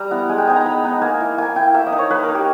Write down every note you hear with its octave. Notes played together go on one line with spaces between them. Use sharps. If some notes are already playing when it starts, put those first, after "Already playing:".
Already playing: G3 A#5
B3 E4
G#3 G#5
G5
B3 D#4 G#5
A#5
G#3 B5
B3 D#4 A#5
A#3 G#5
E4
A#3 G#5
E4 G5
A#3 E5
D#5
D#4
C#5
A#3 B4
A#4
D#4
G4